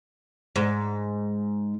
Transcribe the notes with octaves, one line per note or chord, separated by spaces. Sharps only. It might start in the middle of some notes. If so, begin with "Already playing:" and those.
G#2